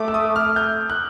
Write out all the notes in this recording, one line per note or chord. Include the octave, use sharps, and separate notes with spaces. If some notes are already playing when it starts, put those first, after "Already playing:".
Already playing: A3 D6
E6
D#6
F6
G6
F#6